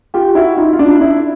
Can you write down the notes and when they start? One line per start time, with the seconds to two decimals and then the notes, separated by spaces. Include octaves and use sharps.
0.14 F4 G4
0.35 E4 F#4
0.57 D#4 F4
0.73 F4
0.79 D4 E4
1.00 D4 E4